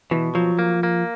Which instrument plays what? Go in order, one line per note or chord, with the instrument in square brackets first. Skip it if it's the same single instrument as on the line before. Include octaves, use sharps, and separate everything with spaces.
[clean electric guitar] B2 [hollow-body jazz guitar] E3
[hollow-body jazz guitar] F3 [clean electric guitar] F#3
[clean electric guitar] A#3
A#3